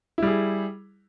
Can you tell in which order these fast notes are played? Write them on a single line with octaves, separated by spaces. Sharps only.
E4 G3 G#4